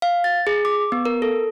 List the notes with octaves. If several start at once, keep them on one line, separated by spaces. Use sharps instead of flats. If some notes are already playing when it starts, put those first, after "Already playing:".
F5
A6
G#4
D6
B3
A#4
A4